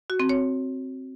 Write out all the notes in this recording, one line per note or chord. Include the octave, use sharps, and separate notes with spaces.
F#4
C4
C#5